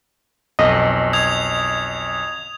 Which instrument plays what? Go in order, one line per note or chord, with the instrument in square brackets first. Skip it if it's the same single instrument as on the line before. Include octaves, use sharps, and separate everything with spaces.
[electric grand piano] B1 F2 [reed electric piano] D#5
[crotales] D#6 G#6 F7